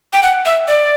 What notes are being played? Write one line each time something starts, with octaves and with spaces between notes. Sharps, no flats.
G5
F#5
E5
D5